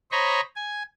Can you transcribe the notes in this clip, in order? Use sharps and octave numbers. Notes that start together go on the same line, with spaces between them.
C5 C#5 D#5 A#5 B5 C#6
G#5